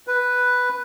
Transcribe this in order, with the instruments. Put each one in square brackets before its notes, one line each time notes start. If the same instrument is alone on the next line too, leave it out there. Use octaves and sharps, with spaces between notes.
[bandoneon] B4